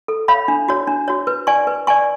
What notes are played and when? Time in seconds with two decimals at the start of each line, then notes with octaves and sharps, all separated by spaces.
0.08 A4
0.28 C#5 F5 B5
0.48 D4
0.69 F#4 C#5
0.87 D4
1.08 F#4 C#5
1.27 B4
1.47 D5 G#5 C#6
1.67 B4
1.87 D5 G#5 C#6